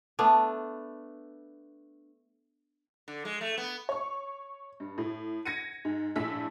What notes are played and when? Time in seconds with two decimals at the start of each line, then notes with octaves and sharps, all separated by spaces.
0.19 A3 B3 D4
3.08 D3
3.25 G#3
3.41 A3
3.58 B3
3.89 C#5 C#6
4.80 G2
4.98 A2
5.45 G#6 A#6 C#7 D#7
5.85 G#2
6.16 A#1 A2 A3 D4 E6 B6